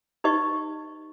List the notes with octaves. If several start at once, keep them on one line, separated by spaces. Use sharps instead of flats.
D#4 G4 B4 D#5 C#6